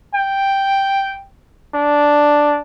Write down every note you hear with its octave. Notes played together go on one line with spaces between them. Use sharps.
G5
D4